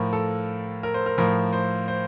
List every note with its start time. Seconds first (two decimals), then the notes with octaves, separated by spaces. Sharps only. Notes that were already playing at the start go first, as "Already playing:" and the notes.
Already playing: A2 F3 A#4
0.13 A4
0.83 A#4
0.94 C5
1.06 A#4
1.18 A2 F3 A#4
1.53 C5
1.88 C5